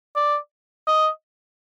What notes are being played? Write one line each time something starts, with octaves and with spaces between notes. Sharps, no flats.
D5
D#5